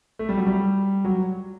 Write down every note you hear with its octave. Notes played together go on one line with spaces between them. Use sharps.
A3
G3
F#3
G3
F#3